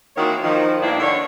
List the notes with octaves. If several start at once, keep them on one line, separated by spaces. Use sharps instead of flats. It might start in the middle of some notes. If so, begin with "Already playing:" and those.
D#3 E3 A#3 C4 F#4 C#5
D#3 F3
G2 A#3 B3 D4 E4
D3 C#5